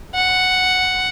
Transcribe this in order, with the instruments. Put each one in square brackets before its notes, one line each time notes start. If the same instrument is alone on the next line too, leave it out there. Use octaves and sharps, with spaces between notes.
[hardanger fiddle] F#5